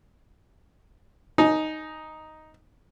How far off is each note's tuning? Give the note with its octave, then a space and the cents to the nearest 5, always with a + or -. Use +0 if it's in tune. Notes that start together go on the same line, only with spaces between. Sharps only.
D#4 +0 G#5 +35